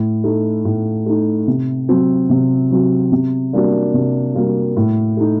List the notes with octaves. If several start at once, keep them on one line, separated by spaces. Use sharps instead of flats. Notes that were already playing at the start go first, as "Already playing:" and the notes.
Already playing: A2
A3 D#4
A2
A3 D#4
C3
F#3 C4 F#4
C3
F#3 C4 F#4
C3
G3 A#3 D4 F#4
C3
G3 A#3 D4 F#4
A2
A3 D#4